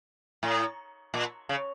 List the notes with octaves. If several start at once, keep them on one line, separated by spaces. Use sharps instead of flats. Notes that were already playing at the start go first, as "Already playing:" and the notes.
A2
A#2
C#3